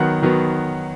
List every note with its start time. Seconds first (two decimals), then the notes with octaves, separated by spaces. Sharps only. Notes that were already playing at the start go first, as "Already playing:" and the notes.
Already playing: D#3 F#3 B3 F#5
0.22 D#3 F#3 B3